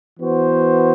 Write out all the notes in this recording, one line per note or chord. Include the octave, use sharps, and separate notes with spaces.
E3 B3 F#4 C5